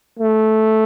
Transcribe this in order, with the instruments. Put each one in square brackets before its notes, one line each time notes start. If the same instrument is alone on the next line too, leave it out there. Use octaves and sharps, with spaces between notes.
[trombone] A3